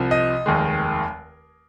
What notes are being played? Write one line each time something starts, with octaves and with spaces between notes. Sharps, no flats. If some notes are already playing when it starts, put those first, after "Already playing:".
Already playing: C2 C3 F3
D#5
F1 D#2 D#3 G#3